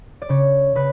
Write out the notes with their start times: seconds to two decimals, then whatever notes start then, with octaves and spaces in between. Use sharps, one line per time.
0.22 D5
0.29 C#3 C#5
0.75 C#3 B4